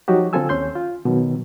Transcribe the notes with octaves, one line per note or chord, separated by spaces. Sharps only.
F3 F#3 D#4 F#4 G4
D3 C4 F4 A4 G#5 E6
D#2 C#4 C6 G6
F4
B2 D#3 F#3